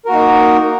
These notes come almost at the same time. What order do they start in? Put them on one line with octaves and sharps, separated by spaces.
A#4 F#4 A#3 D#4